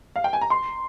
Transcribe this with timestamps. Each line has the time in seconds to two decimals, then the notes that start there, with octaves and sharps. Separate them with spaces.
0.16 F5
0.24 G5
0.33 G#5
0.41 A#5
0.50 C6